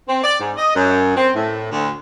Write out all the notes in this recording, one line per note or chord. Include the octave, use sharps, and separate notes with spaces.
C4
D5
G#2
D#5
F#2
C4
A2
D2